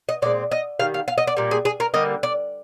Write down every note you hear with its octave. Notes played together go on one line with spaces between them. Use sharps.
D#5
A#2 G#3 C4 D5
D#5
D#3 G3 F5
F5
F5
D#5
D5
A#2 G3 A#3
G#4
G#4
A#4
D3 G3 A#3 D#5
D5